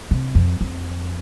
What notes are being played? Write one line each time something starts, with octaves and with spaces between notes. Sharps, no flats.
C3
F2
F2